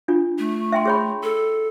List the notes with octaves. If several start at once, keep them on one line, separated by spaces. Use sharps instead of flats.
D4 F4
A3
E5 G5 C6
G#4 C#5 B5
A4